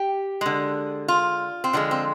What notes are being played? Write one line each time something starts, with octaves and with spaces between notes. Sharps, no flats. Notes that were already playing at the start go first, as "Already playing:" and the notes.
Already playing: G4
D3 G#3
F4
C4
D3 F3 G#3 A#3
C4